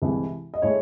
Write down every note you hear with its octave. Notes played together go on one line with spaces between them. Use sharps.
C2 C3 E3 G#3
D#5
A2 G#3 C#5